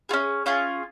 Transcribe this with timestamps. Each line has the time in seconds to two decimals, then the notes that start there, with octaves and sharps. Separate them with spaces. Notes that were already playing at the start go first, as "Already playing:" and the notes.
0.09 F4 G#4
0.13 C#4
0.46 C#4 F4 G#4